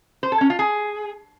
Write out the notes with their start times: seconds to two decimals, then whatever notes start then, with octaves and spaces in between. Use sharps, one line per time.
0.23 C5
0.32 A4
0.41 C#4
0.50 F4
0.59 G#4